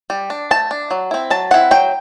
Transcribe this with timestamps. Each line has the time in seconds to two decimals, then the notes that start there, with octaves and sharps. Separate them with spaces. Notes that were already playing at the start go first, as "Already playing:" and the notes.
0.10 G3
0.30 D4
0.51 A3 A5
0.71 D4
0.91 F#3
1.11 C4 E4
1.30 F#3 A5
1.51 C4 E4 F#5
1.71 F#3 G5